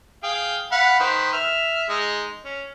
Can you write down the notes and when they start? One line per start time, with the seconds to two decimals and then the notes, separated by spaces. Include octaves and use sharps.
0.24 G#4 F5 G5
0.72 F5 F#5 B5
1.00 D#3 B4 C5
1.33 E5 F6
1.89 G#3 D#4
2.45 C#4